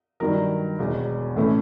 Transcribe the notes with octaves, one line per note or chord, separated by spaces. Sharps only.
G2 D#3 F#3 A#4
E1 E2 B2
A2 E3 A3 C#4